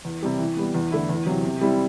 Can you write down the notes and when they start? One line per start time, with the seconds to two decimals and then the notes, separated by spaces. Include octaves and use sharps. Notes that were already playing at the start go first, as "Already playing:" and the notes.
0.05 E2
0.23 C3 G3
0.39 E3
0.57 G3 B3
0.75 E2
0.92 D3 A3 E4
1.09 E2
1.27 C3 F#3
1.45 C3
1.61 G3 C4 E4